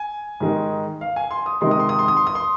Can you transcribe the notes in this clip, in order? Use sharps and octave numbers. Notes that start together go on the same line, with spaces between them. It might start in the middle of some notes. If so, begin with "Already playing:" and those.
Already playing: G#5
G#2 D#3 G#3 D#4
F5
G#5
C6
D#6
C3 D#3 G#3 D#4 C6
D#6
C6
D#6
C6
D#6
C6
D#6
C6